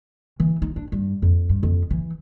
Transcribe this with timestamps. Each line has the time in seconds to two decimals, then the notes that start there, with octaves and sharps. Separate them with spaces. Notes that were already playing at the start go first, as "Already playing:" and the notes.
0.40 E3
0.62 D#4
0.76 D4
0.92 G2
1.22 F2
1.49 G2
1.63 F2
1.90 E3